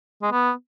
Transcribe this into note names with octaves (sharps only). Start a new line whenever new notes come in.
G#3
B3